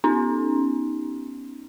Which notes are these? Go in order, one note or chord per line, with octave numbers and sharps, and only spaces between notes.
B3 C#4 D#4